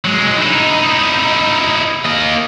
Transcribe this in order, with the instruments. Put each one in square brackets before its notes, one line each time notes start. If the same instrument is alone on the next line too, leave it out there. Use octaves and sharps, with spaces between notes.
[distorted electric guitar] F#3 G#3
D#4 E4
A#3 D#5